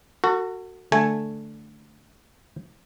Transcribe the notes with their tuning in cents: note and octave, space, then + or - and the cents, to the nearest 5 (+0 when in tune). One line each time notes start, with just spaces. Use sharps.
F#4 +0 A4 +45
D3 +0 A3 +0 G#5 +0